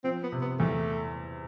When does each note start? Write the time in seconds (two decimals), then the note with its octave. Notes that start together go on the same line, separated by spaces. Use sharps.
0.04 F3 C4
0.23 B3
0.32 C3
0.41 B3
0.59 E2 A3